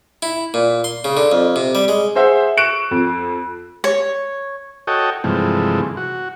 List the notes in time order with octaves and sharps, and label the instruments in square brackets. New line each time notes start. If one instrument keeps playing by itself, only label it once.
[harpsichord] E4
A#2
C6
C#3
D3
F2
C3
G3
G#3
[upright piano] G#4 C5 E5 F#5
C#6 F#6 D7 E7
F2
[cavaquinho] C#5
[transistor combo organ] F#4 A4 C#5 D#5 G5
G2 C3 E3 F3 G#3 A3
F#4